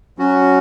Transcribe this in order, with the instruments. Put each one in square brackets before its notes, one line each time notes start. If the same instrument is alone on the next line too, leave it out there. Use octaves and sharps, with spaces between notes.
[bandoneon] F#3 C#4 F#4